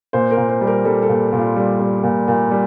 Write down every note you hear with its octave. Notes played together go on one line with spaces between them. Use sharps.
A#2 C5
A#4
A#2
C5
G3
A#4
G3 A4
A4
A#2
A#2
F4
G3
G3
A#2
A#2
G3